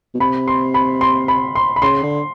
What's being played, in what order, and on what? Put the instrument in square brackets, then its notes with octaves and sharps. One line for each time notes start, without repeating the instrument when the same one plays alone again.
[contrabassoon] B2
[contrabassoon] C3 [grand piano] B5
[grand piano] C6
B5
C6
B5
C6
B5
[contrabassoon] C#3 [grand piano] C6
[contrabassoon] D3